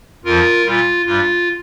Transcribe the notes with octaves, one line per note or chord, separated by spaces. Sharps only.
F2 F3 F4 A#4
A#2 G3 F4
G2 G3 F4